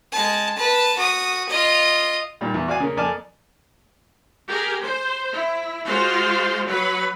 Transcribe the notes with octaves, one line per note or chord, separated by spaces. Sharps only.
G#3 A5
B4 A5
F#4 D#6
F4 D#5
A#2 D#3 G3
E2 E3
F#4 D5 F5 G#5
C#3 A#3
F2 A#3 D5 G#5 A5 F6
G4 G#4 A#4
C5
E4
G#3 F4 F#4 C5 C6
F#3 B4 B5